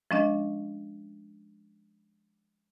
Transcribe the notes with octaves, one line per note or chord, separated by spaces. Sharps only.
F3 G#3 C#4 D4 D#5